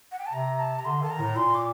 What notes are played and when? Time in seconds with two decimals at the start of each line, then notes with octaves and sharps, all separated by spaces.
0.12 F#5
0.19 G5
0.26 A5
0.33 C3 A#5
0.59 A5
0.79 A#5
0.85 D3 C6
1.02 D#3 A5
1.10 A#5
1.19 A2
1.36 A#2 C6
1.55 D6